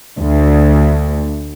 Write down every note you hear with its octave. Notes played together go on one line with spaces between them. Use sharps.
D2